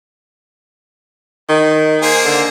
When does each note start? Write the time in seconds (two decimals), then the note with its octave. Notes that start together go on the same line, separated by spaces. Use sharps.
1.49 D#3
2.02 A#3 G#4 C5
2.25 D3